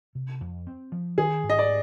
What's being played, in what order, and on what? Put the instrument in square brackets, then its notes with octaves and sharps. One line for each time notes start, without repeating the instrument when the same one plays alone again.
[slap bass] C3
F2
C4
F3
[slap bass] D#3 [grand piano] G#4
[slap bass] G#2
[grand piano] D#5
D5